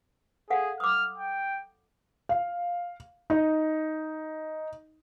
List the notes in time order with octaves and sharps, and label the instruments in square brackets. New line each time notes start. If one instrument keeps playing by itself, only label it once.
[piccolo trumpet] G#4 [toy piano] A4 F5 F#5
[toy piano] D6 D#6 [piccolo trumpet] F6
[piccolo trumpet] G5
[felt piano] F5
D#4